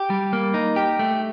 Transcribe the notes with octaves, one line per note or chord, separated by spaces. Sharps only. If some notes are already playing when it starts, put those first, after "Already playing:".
Already playing: G4
G3
A#3
D#4
G4
A3